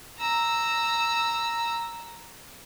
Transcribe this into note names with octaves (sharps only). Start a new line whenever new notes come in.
A#5 E6